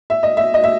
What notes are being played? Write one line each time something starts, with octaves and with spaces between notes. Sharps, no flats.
E5
D#5
E5
D#5
E5